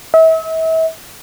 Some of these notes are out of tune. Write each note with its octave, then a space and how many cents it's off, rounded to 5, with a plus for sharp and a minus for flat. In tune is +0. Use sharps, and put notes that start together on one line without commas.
E5 -35